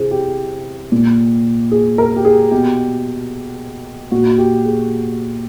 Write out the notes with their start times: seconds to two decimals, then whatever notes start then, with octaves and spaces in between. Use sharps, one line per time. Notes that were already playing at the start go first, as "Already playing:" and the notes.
Already playing: C3 E3 G#4 C5
0.11 G4
0.92 A#2
1.72 G#4
1.98 A#4
2.16 G4
2.25 G#4
2.51 B2 G4
4.11 A#2 F#4
4.38 G4
4.65 G#4